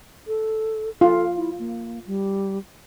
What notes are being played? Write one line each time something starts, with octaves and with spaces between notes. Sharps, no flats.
A4
F4 A4
E4
A#3
G3